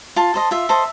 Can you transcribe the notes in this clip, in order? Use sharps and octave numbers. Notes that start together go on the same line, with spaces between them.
F4 A5
A4 C5 D#5
F4 E5
A4 C5 D#5